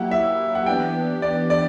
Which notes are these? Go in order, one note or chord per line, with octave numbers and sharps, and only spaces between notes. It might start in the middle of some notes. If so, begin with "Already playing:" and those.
Already playing: F#3 A#3 E4 G4 F#5
E5
F#5
E3 B3 D4 G4 G5
D5
D5